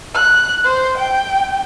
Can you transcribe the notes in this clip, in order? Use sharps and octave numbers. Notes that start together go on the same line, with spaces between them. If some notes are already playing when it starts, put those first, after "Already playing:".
F#6
C5
G5